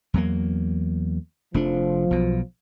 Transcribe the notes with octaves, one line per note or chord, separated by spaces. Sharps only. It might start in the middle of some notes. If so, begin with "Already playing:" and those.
E2 F#3 A#3
F1 F3 A3 D4
B1 B2